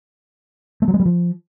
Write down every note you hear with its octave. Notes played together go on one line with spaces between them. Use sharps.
A3
F#3
G#3
G3
F3